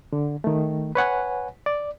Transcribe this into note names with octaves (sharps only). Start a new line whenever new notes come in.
D3
D#3 A3
B4 C#5 F#5 G#5
D5